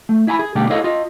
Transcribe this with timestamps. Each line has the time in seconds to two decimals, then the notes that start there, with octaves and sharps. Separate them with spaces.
0.09 A3
0.27 E4 E5 G#5 A#5 B5
0.39 G#4
0.55 B2 D3 G3 A3 D4 G4
0.70 E4 G#4 A4 C#5 D#5 F5
0.84 F4 D#5